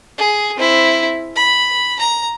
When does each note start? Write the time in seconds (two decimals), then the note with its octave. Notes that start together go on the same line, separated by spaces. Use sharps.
0.18 G#4
0.57 C4 E4
1.36 B5
1.99 A#5